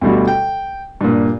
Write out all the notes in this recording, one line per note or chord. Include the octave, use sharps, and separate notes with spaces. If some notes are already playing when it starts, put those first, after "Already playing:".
D2 B2 G3 F#4
G5
G2 A#2